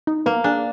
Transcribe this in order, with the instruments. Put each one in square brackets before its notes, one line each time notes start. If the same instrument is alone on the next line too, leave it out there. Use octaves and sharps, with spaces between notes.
[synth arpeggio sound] D#4
[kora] A#3 [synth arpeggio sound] B3
[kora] D4 [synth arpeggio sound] G#4